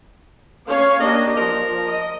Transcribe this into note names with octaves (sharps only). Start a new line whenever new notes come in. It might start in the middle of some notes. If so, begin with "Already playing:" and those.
C#4 C#5 F5
A#3 D4 G4 D#5
F3 A#4
D#5